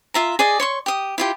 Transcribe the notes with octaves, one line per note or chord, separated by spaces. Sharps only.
F4 E5 A#5
G#4 D5 D#5
C#5 C6 C#6
G4 D#6
E4 F4 G4